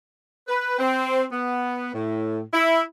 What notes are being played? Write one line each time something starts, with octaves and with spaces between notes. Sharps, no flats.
B4
C4
B3
A2
E4